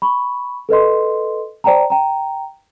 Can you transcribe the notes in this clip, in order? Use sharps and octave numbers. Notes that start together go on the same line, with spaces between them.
B5 C#6
A4 B4 D#5 C6
C5 D5 G5 A5 A#5
G5 A#5